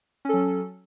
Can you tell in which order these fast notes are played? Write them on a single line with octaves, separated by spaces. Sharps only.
C#4 A4 F#3